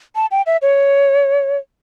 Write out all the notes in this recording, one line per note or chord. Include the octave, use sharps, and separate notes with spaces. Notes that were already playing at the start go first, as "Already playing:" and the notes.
A5
G5
E5
C#5